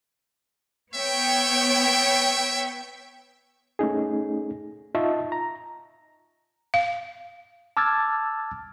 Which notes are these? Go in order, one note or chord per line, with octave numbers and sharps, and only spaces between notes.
B3 C#5 E5 G5
A3 C#4 D#4 G#4
D#4 F4 D#5 E5 A5 C#6
A#5
F5
A5 D6 E6 F6 G#6 A6